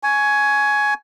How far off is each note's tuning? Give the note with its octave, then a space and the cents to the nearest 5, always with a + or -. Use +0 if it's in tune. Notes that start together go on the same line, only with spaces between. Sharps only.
G#5 +15 C#6 +10